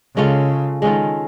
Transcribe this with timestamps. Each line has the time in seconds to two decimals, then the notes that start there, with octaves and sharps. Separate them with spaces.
0.16 C#3 G#3 C#4 F4 A4
0.82 D#3 G#3 C#4 F4 A4